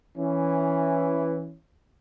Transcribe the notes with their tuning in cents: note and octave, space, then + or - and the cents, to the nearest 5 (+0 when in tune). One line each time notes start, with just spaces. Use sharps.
E3 +0 C#4 +0